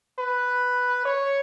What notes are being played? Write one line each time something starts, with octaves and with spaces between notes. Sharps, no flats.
B4
C#5